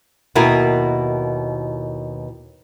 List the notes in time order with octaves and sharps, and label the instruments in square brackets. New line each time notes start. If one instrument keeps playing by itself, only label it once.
[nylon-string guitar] D#2 B2 E4 F#4 A#4 B4